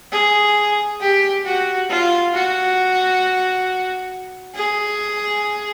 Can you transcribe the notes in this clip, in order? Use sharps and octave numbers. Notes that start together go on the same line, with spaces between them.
G#4
G4
F#4
F4
F#4
G#4